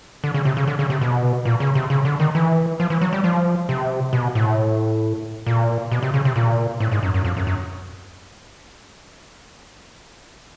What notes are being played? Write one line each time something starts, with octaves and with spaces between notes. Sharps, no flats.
D3
C#3
C3
C#3
D3
C#3
C3
B2
A#2
C#3
C3
C#3
D3
D#3
E3
F3
E3
F#3
G3
F3
C3
B2
A2
A#2
B2
C3
C#3
C3
A#2
A2
G#2
F#2
F#2
F2
F#2
F#2